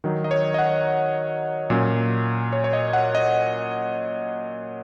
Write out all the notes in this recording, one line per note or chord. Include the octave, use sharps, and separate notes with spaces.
D#3 F#3 D#4
D#5
C#5
D#5
F#5
A#2 F#3 C#4
C#5
C#5
D#5
F#5
D#5